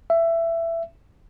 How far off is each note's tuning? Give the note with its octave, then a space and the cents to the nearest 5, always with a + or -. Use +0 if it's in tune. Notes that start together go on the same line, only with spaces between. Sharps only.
E5 +15